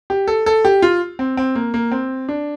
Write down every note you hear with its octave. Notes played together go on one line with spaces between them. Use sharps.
G4
A4
A4
G4
F4
C4
C4
A#3
A#3
C4
D4